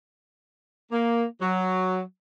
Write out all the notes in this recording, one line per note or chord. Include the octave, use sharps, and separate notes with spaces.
A#3
F#3